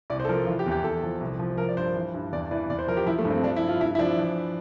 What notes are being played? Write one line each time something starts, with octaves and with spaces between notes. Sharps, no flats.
C2 D5
C5
A4
F3 A#4
E3 F4
G4
E2
G4
E2 A4
F3
C2
F3
F3 A#4
D5
G2 C5
E3
G2
E2 D5
E3 D5
E2 D5
C5
F3 A#4
G4
F3 E4
A3
G2
C4
F3 D4
E4
G2
F4
G2 E4
E4
F3 D4
E3